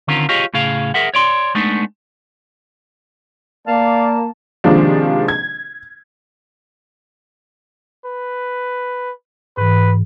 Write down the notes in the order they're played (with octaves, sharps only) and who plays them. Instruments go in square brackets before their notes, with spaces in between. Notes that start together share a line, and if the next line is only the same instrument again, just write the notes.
[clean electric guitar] D3 D#3 C4 C#4 F4 A#4
F4 G4 G#4 C#5 D#5 F5
A2 C#3 G#4 F5
G#4 A#4 E5 F#5
C#5 D5 C6
G#3 A3 B3 D4 D#4
[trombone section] A#3 [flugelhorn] D5 [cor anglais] F5 [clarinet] A5
[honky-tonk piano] C3 D#3 F3 G#3 A#3 D4
G#6
[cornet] B4
[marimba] G#2 E3 [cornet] B4